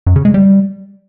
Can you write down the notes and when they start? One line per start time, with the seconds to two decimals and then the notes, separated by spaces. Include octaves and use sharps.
0.07 F#2
0.16 C#3
0.25 G#3
0.34 G3